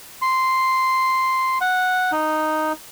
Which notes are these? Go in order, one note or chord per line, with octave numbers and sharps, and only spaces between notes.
C6
F#5
D#4